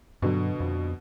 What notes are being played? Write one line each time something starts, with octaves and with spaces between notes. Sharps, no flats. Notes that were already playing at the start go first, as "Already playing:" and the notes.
G2 B2 D3 F#3
F2